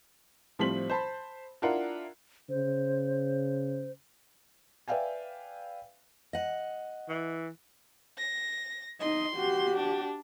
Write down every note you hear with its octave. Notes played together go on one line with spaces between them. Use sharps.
A2 F3 G3 C4 B6 F#7
C5 A5 B5
D4 E4 F4 A#4 F#5
C#3 C5
B4 D5 E5 F5 G5 G#5
D#5 F#5
E3
A#6
D#4 D#5 C6
F#4 G4
D4